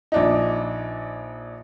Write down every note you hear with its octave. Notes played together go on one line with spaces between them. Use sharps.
A#1 D4 D#4